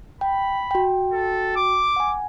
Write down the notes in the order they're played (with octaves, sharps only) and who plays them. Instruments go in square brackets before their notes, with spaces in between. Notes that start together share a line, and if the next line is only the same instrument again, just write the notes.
[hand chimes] G5 [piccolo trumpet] B5
[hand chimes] F#4 G5
[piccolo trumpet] A4
D6
[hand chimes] F#5 G#5